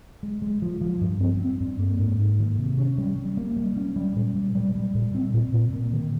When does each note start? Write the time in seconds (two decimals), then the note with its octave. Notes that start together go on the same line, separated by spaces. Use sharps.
0.23 G#3
0.42 G#3
0.62 F3
0.81 F3
1.01 G2
1.20 C4
1.40 C4
1.60 G2
1.80 A#3
1.99 G#2
2.19 A#3
2.39 D#3
2.59 C3
2.78 C#4
2.98 G3
3.18 G3
3.37 A#3
3.56 G3
3.76 C#4
3.96 G3
4.16 A#2
4.36 G3
4.55 G3
4.75 G3
4.95 A#2
5.15 C4
5.34 A#2
5.54 A#2
5.73 A#3
5.93 D#3